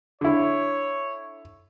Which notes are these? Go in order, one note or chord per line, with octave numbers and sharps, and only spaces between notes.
D3 E4 C#5